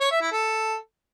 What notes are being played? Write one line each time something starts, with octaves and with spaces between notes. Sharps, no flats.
C#5
E5
E4
A4